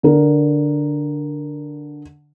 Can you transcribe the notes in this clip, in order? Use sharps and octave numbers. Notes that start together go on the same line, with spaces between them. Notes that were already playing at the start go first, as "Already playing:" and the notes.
D3 A#4